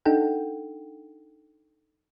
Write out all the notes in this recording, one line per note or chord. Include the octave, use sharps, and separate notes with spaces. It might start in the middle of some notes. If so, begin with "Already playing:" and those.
D4 D#4 A4 F#5 G5